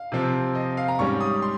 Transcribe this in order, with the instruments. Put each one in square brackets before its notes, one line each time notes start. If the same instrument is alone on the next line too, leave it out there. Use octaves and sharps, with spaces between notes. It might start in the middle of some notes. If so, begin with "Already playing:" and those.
Already playing: [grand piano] F5
C3 F3 C4
D#5
F5
A#5
G#2 G3 C#4 C#6
D#6
C6